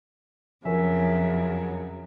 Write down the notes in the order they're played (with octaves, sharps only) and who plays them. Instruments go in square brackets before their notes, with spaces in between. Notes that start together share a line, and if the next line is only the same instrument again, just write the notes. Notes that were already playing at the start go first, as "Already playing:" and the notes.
[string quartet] F2 C#3 F#3 [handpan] F3 [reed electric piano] A#4 C#5 G#5 [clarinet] E5